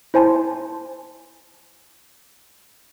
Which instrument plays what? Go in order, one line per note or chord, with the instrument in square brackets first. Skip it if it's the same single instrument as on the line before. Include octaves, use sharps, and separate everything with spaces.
[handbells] E4 C5 G#5 A5 C6